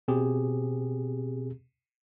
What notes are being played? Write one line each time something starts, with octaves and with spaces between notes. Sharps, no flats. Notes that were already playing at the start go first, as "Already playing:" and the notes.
B2 C4 G4 G#4